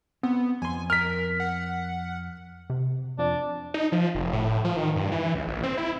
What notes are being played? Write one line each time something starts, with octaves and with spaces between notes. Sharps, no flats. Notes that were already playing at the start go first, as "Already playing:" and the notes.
B3 C4
F2 G#5 C6
A#4 F6 B6
F#5
C3
F2 D4
D#4
F3
F1
A2
F3
D#3
G2
E3
C#2
A#1
C4
E4